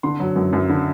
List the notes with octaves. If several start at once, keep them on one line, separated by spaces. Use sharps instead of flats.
D3 C6
F#3
F#2
F#2
D3